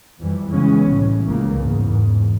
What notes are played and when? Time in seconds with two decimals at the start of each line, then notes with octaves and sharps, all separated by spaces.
0.17 F2 E3 G3
0.48 C#3 E3 G#3 B3 C#4
0.85 C2 A2 E3
1.27 C#2 C#3 A#3
1.57 E2 G#2